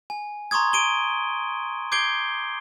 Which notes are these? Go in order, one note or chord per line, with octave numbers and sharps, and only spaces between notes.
G#5
A#5 C6 C#6 D#6 G#6
D7 D#7 G7
D6 G6 G#6 C7 D7 G7